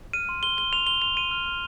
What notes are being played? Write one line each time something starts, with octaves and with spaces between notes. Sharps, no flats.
F6 D#7
C6
C6 G7
C6 G7
C6 F7
C6 G7
C6 F7
C6 D#7
F6
F6